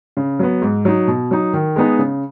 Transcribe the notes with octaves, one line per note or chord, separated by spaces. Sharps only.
C#3
F#3 B3
G#2
F#3 D#4
B2
F#3 D#4
D#3
G#3 B3 D#4
C#3